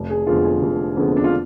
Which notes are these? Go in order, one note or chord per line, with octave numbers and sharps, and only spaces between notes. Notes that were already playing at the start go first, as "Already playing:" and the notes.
Already playing: F1
G#4
F2 D3 G#3 B3 F4
G#4
F1
F2 D3 G#3 B3
D4
F4